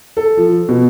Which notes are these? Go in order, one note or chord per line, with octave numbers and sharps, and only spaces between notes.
A4
F3
B2